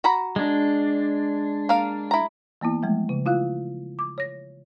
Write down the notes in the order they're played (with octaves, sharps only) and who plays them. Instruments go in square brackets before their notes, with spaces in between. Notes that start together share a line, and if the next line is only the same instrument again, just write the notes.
[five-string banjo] F#4 A#5 B5
[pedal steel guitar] G#3 D4
[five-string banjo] A#3 F5
E4 A#5
[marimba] E3 A#3 B3 E4
F3 G#3 A3
C#3
E4 F4 F5 F#6
D6
C#5 A#6